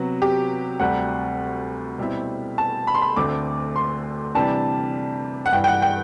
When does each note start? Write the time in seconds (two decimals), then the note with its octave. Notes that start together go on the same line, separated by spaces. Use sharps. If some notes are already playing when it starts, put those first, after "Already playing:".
Already playing: C3 F#3 B3 F#4
0.22 G4
0.80 D2 C3 G3 F#5
1.99 B2 G3 C4 E4
2.58 A5
2.87 B5
2.94 C6
3.02 B5
3.16 D2 D3 A3 C4 D6
3.76 C6
4.35 C3 E3 G3 D4 A5
5.46 F#5
5.52 G2 E3 G3 G5
5.64 G5
5.67 F#5
5.82 G5